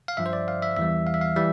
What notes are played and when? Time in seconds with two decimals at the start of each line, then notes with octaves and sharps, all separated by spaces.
0.08 F5
0.17 G2 F3 E5
0.26 C5
0.33 D5
0.48 F5
0.62 E5
0.77 E2 E3 G3 E5
1.07 F5
1.14 E5
1.21 F5
1.36 E3 G3 E5